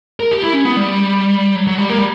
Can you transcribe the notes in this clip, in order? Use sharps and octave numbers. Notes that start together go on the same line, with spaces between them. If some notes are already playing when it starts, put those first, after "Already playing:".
A#4
G4
E4
C#4
B3
G3
F#3
F#3
G3
A#3
G3